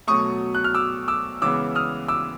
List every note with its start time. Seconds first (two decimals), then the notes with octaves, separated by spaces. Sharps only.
0.07 B2 F#3 A3 C#6 D#6
0.55 F#6
0.64 F6
0.74 D6 E6
1.08 D6 E6
1.42 C#3 E3 G#3 B3 D6 E6
1.75 D#6 F6
2.08 D6 E6